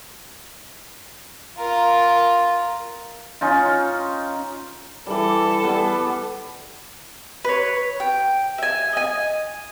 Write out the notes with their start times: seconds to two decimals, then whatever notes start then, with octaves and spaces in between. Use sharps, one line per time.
1.58 F4 A#4
3.41 C#4 D#4 F4
5.06 E3 G3 A4
5.63 G3 B3 G#5
7.45 B4 C#5
8.00 G5
8.58 E5 G#5
8.93 D#5 G#5